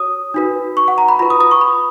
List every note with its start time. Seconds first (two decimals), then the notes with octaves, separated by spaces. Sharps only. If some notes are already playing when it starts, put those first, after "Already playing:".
Already playing: F#4 C#5 D#6
0.34 D#4 F#4 B4
0.77 C#6
0.88 F#5
0.98 A#5
1.09 B5
1.19 F4 B4 B5
1.30 D#6
1.40 D#6
1.51 C#6
1.61 B5